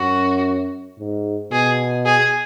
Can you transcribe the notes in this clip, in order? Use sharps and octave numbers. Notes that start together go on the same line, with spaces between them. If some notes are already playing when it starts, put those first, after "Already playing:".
Already playing: F#2 F#4
G#2
B2 G#4
G#4